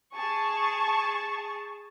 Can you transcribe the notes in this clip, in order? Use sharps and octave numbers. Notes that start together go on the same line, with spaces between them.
G#4 A5 C#6